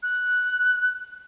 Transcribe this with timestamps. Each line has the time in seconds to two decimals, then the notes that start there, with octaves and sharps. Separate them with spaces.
0.03 F#6